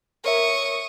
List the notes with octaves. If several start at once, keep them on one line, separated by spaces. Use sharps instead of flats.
A#4 C#5 E5 C#6 D#6